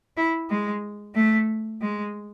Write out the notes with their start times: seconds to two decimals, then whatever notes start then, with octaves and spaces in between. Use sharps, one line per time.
0.17 E4
0.50 G#3
1.15 A3
1.81 G#3